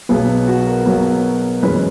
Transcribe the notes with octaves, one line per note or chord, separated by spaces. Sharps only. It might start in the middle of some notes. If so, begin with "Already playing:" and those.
B1 B2 F#3 B3 G#4
F#4
A#4
B1 B2 F#3 B3
F#2 E3 G#3 C#4 B4